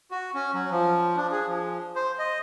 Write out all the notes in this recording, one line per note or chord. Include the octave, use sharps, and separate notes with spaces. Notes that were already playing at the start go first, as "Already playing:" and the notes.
F#4
C#4
F#3
F3
D4
G#4
F3
C5
D#5